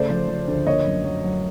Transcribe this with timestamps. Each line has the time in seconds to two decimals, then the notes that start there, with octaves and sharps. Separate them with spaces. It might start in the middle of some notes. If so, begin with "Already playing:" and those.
Already playing: C#3 A3 C5 D5
0.10 F3
0.28 F3
0.48 D2
0.66 A#3 C#5 D#5
0.85 F#2
1.04 F#3
1.24 F#3